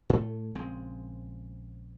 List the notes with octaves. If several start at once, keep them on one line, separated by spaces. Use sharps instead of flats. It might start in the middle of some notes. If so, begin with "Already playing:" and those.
A2 A3
A#1 C#3 G#3 C4